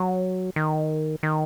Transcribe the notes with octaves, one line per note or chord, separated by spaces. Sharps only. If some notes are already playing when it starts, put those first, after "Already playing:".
Already playing: F#3
D#3
D#3